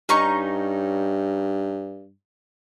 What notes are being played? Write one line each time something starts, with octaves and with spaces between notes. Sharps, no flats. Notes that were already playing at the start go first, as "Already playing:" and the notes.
G2 C#4 D#4 C#6